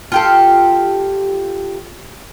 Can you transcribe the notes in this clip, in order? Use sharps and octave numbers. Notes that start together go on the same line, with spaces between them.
F4 G4 A4